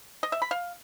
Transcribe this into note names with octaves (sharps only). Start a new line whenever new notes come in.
D#5
E5
B5
F5